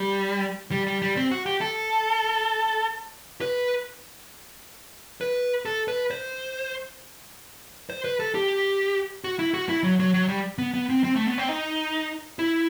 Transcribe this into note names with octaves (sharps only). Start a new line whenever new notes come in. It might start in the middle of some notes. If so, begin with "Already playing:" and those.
Already playing: G3
G3
G3
G3
C4
F#4
G4
A4
B4
B4
A4
B4
C5
C5
B4
A4
G4
F#4
E4
F#4
E4
F#3
F#3
F#3
G3
B3
B3
C4
C4
A3
B3
C4
D#4
E4